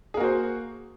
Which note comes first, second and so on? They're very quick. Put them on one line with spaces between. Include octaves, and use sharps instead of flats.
G#4 A#3 F#4 C5